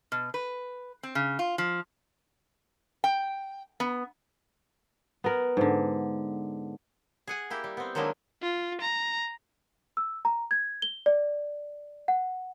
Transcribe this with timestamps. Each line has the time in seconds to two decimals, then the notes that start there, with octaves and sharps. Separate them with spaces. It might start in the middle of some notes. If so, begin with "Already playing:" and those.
0.12 B2
0.34 B4
1.03 C4
1.15 C#3
1.39 F4
1.58 F3
3.04 G5
3.80 B3
5.24 B3 A#4
5.57 G#2 D3
7.27 G#4 F#5 G#5
7.50 A#3 E4 G4
7.64 G3
7.77 B3 C4
7.95 D#3 F#3 G#3 A#3 D4 E4
8.43 F4
8.81 A#5
9.97 E6
10.25 A#5
10.51 G#6
10.82 G7
11.06 D5
12.08 F#5